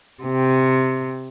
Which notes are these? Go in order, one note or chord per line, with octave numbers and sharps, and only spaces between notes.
C3